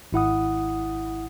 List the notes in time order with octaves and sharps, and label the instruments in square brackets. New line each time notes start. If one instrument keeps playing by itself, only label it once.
[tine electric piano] G#1 E4 F#5 D#6